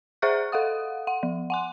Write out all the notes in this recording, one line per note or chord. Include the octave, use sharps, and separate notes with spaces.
G#4 C5 E5 C#6 F#6
A4 F5 F#5 D#6
F#5
F3
F#5 G#5 C6